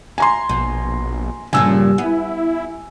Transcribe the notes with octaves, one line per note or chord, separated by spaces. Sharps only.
G#5 A#5 C6
A#1 B2
G2 A#2 C#3 F3 G#5 E6
B3 E4